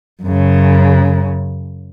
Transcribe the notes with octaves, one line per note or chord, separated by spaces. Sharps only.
F#2 C#3